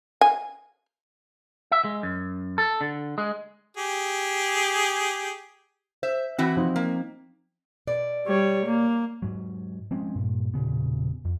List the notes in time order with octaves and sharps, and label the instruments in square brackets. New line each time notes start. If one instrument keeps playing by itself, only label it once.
[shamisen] G#5
[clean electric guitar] E5
G#3
F#2
A4
D3
G#3
[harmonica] G4 G#4
[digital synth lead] C5 [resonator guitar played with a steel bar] E5
[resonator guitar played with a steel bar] E3 E4 F#4 [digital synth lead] C4
[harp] F3 D#4 C6
[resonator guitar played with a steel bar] A#3 [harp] B6
[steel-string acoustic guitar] B2 D5
[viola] G3 C#5
A#3
[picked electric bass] G#2 F#3
F3 G#3 C4 C#4
G2 A#2
E1 A#2 C#3 B3
F2